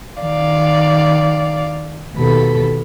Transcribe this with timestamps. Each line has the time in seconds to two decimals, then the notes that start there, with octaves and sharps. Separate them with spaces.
0.21 D#3 D5 F5
2.17 D#2 B2 A4 B5